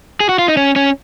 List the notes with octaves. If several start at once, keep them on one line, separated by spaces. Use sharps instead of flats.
G#4
F#4
F4
D#4
C#4
C#4